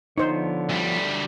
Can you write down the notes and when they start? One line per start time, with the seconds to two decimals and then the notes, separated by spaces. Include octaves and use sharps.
0.18 D3 F3 B3 D#4 C5 C#5
0.70 D2 G3